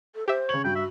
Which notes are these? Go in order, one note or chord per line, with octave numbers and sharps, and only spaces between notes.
A4
G4 C5 E5
C#3 C#5 F#7
G2 F#4 G5
E5